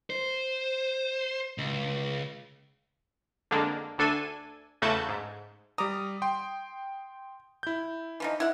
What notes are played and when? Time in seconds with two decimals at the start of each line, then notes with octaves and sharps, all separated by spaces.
0.10 C5
1.58 C#2
3.51 F2 D3 G#3 A#3 D4
3.98 D2 D4 A4 G#5 D#7
4.82 E2 C#3 A3 F#4 A5 G6
5.09 G#2
5.78 G3 A#5 D6 D#6
6.22 G5 C6
7.63 E4 G6
8.20 E3 F3 D#4
8.40 E4 F#5